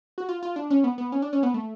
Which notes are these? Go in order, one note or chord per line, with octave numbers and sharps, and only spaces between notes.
F#4
F4
F4
D4
C#4
B3
B3
C#4
D4
C#4
B3
A3